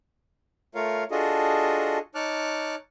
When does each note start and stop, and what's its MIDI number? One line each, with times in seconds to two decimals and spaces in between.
0.75 1.04 57
0.75 1.04 65
0.75 1.04 70
0.75 1.04 73
0.75 1.04 77
1.11 1.98 62
1.11 1.98 65
1.11 1.98 66
1.11 1.98 68
1.11 1.98 69
1.11 1.98 75
2.15 2.75 63
2.15 2.75 73
2.15 2.75 81
2.15 2.75 86
2.15 2.75 89
2.15 2.75 90